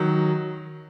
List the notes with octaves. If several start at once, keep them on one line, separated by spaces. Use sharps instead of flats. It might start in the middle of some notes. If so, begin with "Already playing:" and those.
Already playing: D#3 F#3